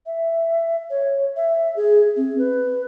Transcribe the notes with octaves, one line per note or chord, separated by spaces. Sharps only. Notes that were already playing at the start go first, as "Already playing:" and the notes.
E5
C#5
E5
G#4
C4
B4